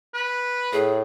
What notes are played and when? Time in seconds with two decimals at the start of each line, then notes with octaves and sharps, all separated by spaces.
0.14 B4
0.73 A2 G#4